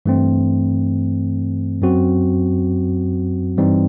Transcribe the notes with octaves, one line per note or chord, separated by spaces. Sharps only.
G2 E3 A3 C4
F#2 F#3 C4 F#4
G2 E3 G3 C4 D#4